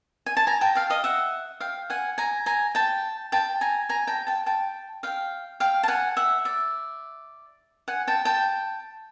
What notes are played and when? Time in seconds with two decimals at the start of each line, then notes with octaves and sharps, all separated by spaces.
0.26 G#5
0.37 A5
0.47 G#5 A#5
0.61 G5 A5
0.75 F5 G5
0.90 D#5 F5
1.04 E5 F#5
1.60 F5 G5
1.90 F#5 G#5
2.18 G#5 A#5
2.46 G#5 A#5
2.75 G5 A5
3.32 G5 A5
3.61 G#5 A#5
3.89 G#5 A#5
4.07 G5 A5
4.27 G5 A5
4.46 G5 A5
5.03 F5 G5
5.60 F5 G5
5.83 A5
5.88 F#5 G#5
6.17 E5 F#5
6.45 D5 E5
7.88 F#5 G#5
8.08 G5 A5
8.25 G5 A5